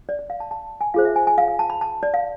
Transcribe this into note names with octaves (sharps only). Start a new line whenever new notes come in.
D5
D5
F5
A5
A5
G#5
F4 G#4 C5 F5
E5
G#5
G#5
F5
F5
A5
B5
A5
D5
F5